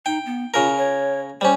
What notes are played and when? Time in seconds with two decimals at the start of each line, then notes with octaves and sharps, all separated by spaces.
0.06 D#4 G5
0.26 B3
0.54 C#3 F4 A#4
0.77 C#5
1.41 G3 C#4 C5